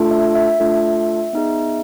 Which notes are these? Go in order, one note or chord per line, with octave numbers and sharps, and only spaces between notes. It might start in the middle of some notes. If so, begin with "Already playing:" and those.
Already playing: A3 D4 F4 A4
E5
E5
A3 D4 F4 A4
B3 D#4 G#4